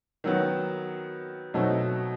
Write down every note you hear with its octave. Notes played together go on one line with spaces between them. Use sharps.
D#3 F#3 B3
B2 F#3 A3 C4 D#4